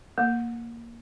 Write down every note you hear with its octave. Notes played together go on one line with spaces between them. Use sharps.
A#3